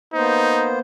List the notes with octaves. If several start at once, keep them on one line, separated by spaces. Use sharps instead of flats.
A#3 B3 D#4 C5